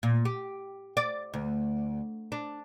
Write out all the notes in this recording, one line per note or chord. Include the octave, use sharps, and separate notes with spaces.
A#2
G4
D5
D2
D4